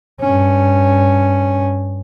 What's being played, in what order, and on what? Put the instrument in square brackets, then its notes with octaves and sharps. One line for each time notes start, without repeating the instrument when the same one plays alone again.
[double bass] G2 C#4